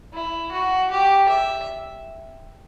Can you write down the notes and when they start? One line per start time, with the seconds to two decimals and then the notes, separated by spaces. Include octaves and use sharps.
0.14 E4
0.52 F#4
0.91 G4
1.29 E5